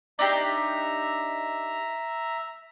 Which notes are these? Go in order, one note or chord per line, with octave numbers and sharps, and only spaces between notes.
D4 D#4 G4 E5 A#5